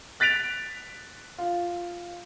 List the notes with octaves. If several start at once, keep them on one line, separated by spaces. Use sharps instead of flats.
F#6 A6 B6 D7 F7
F4